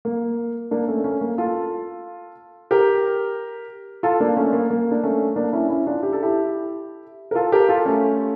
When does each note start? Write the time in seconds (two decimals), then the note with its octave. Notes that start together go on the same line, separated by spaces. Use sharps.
0.05 A#3
0.71 A#3 D4
0.87 A3 C#4
1.04 A3 C#4
1.21 A#3
1.38 F4 A4
2.71 G4 A#4
4.03 F4 A4
4.20 A#3 D4
4.37 A3 C#4
4.53 A#3
4.70 A#3
4.91 D4
5.03 A3 C#4
5.36 A#3 D4
5.53 C#4 E4
5.70 C#4 E4
5.87 D4 F4
6.03 G4
6.13 A4
6.23 E4 G4
7.31 A#4
7.35 F4 A4
7.52 G4 A#4
7.69 F4 A4
7.86 A3 C#4